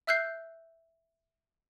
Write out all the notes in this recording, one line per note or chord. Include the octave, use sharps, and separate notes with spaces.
E5 E6 F#6 G6 C7